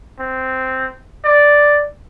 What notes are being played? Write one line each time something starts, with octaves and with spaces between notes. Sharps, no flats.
C4
D5